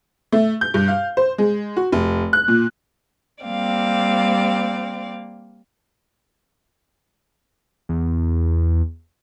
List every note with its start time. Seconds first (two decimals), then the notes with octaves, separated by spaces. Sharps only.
0.32 A3
0.61 G6
0.74 G2
0.88 F5
1.17 C5
1.38 G#3
1.76 F#4
1.92 F1
2.33 F#6
2.48 A#2
3.44 G3 A#3 C4 D5 F5
7.89 E2